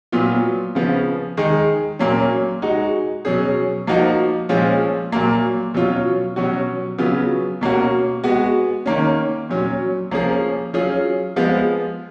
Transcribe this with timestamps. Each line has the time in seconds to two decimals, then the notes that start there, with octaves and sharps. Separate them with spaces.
0.12 A#2 F#3 B3 F4
0.75 C#3 F3 B3
1.37 D#3 G#3 D#4 G#4
1.99 A#2 F#3 A#3 C#4
2.62 G#3 D#4 F#4
3.25 B2 F#3 C#4 G#4
3.87 F3 A#3 D#4 F#4
4.49 A#2 F3 G#3 C#4
5.12 A#2 F#3 A#3
5.74 B2 F#3 C#4 F4
6.36 B2 F#3 C#4 F#4
6.98 C#3 F#3 B3 F4
7.61 B2 A#3 C#4 F#4
8.24 G#3 B3 F#4
8.86 D#3 A#3 C#4
9.49 A#2 F#3 C#4
10.11 F3 A#3 C#4 G#4
10.73 F#3 C#4 F4 G#4
11.36 F3 G#3 B3